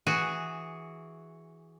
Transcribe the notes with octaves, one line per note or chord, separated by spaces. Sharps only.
E3 F#4 G#4